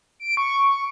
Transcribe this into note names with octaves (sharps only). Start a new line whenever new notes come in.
D7
C#6